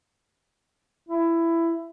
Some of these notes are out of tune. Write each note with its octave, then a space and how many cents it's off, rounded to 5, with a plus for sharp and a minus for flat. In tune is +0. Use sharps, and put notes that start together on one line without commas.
E4 +15